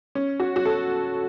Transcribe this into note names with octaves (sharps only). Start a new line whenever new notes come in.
C#4
F#4
F#4
A4